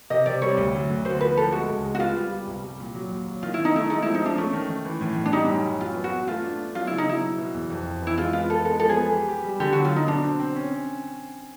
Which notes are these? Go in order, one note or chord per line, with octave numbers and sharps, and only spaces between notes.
C3 D#5
C3 D5
G3 C#5
D2
F#3
D2
F#4 C5
F3 B4
F3 A4
G#3 F#4
C#2
G#3
F#4
B3 F4
G3
G3
C2
G3
A#2
F#3
D#2
F#3
D#3 F4
D#3 E4
D#4
A3 E4
G#3 D#4
F3 E4
D#4
F3 D4
A3 C#4
D#3
D#3
E3
A2
A2
D4
G3 D#4
F#2
F#2
F#3 F4
B3
F#4
B3
A3 F4
D4
D4
F#3 F4
C#3 E4
D#4
F#3 E4
B2
B2
E2
F2
F2
E3 E4
G#3 F4
B3 F4
B3 A4
G#3 A4
F3 A4
G#4
B3
G4
G4
G3
D3 G4
F#3 F#4
F4
F#3 D#4
B2 D4
C4
C4
C#4
C#4